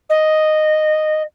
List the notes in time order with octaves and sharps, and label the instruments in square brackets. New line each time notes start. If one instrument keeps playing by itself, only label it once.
[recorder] D#5